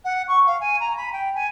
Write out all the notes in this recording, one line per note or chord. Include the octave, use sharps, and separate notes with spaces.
F#5
C#6
F5
G#5
A#5
B5
G5
G#5